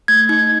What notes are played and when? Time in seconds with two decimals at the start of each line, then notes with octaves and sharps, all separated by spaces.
0.08 A3 G#6
0.29 D#4 G#6